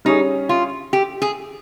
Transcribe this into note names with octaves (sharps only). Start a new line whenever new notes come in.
G3 C#4 D#4 G#4
F4
G4
G#4